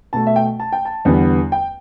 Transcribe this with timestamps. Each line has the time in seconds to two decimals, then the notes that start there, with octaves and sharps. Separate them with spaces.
0.13 B2 A3 A5
0.27 E5
0.36 G5
0.60 A5
0.72 G5
0.85 A5
1.05 E2 D3 G3 B3
1.52 G5